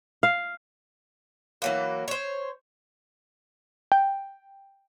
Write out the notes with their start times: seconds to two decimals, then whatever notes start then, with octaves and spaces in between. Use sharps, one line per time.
0.23 F5
1.62 E3 F#3 A#3
2.08 C5 C#5
3.92 G5